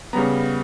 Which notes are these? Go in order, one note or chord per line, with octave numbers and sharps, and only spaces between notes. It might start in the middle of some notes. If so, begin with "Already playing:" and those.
C#3 G3 B3 A#5